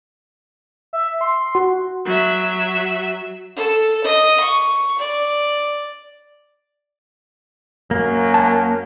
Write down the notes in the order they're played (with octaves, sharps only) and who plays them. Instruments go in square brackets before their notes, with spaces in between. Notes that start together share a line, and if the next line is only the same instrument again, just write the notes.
[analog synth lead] E5
C6
F#4
[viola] F#3 E5
[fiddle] A4
D#5
C#6
D5
[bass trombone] F#2 [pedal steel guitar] A#3
[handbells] A5